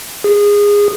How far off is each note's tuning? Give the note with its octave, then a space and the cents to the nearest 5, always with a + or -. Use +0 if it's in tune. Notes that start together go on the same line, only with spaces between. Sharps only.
G#4 -20